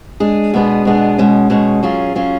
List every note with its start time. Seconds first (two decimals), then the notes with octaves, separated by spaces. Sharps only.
0.20 G#3 D4 G#4
0.54 B2 G#3 B3 D4 G#4
0.85 B2 G#3 B3 D4 G#4
1.18 B2 G#3 C#4
1.50 B2 G#3 C#4
1.83 F#3 C#4 F4 G#4
2.15 F#3 C#4 F4 G#4